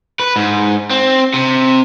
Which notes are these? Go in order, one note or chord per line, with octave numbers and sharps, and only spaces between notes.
B4
G#2
C4
C3